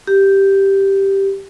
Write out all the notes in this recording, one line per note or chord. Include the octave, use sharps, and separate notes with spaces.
G4